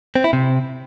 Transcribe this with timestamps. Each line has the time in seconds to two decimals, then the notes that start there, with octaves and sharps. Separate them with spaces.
0.16 C4
0.24 E4
0.33 C3